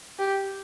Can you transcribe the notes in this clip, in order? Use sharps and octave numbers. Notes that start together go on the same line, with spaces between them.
G4